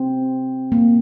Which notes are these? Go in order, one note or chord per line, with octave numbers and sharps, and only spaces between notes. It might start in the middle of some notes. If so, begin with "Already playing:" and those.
Already playing: C4
A#3